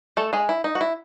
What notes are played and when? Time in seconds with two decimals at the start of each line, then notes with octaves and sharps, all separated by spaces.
0.17 A3 A4
0.33 G#3 G#4
0.49 E4
0.64 D#4
0.75 F#4
0.81 E4